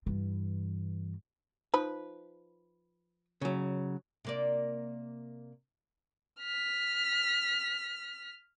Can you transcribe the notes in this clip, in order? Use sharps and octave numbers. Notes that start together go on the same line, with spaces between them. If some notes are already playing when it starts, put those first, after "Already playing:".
G2 E3
F3 D#4 B4 B5
C#3 F#3
C3 A#3 D5
F6 B6